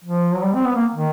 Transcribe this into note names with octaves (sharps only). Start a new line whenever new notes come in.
F3
F#3
G3
C4
B3
A#3
D#3